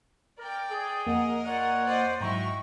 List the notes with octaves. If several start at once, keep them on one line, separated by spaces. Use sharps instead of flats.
A#4 D5 G5
G#4
F2 A#3 A#4 D#5 F#5
F4 C#5 D5 F#5
C5 D5 D#5
G#2 F#3 D#4 E4 F#4 G5 A#5 C#6